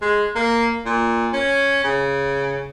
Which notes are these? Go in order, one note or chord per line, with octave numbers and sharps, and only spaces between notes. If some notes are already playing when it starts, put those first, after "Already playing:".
G#3
A#3
A#2
C#4
C#3